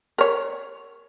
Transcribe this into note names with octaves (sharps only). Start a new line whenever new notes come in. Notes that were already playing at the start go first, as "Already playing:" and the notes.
A#4 C#5